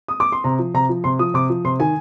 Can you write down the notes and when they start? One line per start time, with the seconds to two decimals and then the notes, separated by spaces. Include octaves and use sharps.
0.08 D#6
0.20 D6
0.32 C6
0.44 C3 A#5
0.59 F3
0.74 C3 A#5
0.89 F3
1.04 C3 C6
1.19 F3 D#6
1.34 C3 D6
1.50 F3
1.65 C3 C6
1.80 D#3 G#5